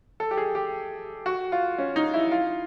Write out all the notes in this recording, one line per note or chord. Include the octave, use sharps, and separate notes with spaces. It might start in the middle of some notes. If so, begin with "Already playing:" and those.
A4
G4
G#4
G4
F#4
F4
C#4
D#4
E4
F4